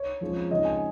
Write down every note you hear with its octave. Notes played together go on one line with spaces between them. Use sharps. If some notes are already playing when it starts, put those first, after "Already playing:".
Already playing: C#5
F2 F3 G#3 C#4
F2 C#3 G#3 D#4 D#5
G#5